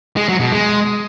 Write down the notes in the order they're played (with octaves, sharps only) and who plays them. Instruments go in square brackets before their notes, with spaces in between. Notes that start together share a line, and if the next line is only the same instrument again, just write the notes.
[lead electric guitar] G#3
F#3
B2
G#3